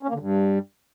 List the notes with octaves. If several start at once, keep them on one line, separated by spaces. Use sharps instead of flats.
C#4
A#3
D3
G2